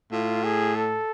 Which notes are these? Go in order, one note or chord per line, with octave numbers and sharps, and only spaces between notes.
A2 F4
G#4
A4